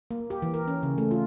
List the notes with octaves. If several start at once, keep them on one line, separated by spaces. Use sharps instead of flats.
A#3
G4
E3
A#4
C#4
C#3
A3
F4